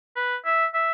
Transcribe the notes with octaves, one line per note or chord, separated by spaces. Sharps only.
B4
E5
E5